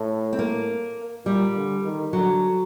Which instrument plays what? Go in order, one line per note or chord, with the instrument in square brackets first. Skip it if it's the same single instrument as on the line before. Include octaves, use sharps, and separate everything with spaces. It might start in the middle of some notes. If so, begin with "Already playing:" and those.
Already playing: [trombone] A2
[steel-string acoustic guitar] C4
A#3
[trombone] A#2 [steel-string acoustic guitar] G3
[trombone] D3
D#3
[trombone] D3 [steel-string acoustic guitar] F#3